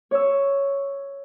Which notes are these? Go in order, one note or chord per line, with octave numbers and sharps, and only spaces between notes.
C#5 E6